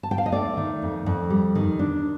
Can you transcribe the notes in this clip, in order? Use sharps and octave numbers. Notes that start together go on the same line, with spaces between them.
A5
G5
F5
D#5
A3 D5
D#3
F2
F2
G3
D#3
D4